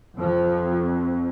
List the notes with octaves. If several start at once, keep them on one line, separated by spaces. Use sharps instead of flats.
F2 F3